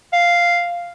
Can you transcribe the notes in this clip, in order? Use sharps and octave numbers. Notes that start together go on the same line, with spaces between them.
F5